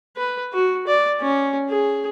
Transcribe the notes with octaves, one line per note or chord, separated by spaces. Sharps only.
B4
F#4
D5
C#4
G#4